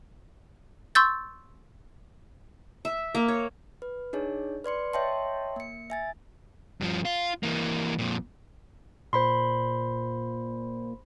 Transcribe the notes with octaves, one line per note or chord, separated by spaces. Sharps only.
C6 C#6 E6 G6 A6
E5
A#3
C#5
B4
D4 D#4 G#4 C#5
B4 D5 C6 C#7
C#5 D#5 E5 G5 A5 C6
A#3 C#7
E5 G#5 A6
G2 F3
F4
E3 A#3
F2 A#2
A#2 C5 B5 C6